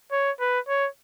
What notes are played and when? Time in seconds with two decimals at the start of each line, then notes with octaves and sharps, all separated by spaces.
0.12 C#5
0.40 B4
0.68 C#5